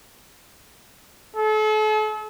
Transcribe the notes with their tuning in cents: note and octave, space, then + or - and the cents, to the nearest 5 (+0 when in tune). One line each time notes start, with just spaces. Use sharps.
A4 -40